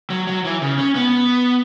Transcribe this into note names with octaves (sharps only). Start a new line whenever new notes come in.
F#3
F#3
E3
C#3
C#4
B3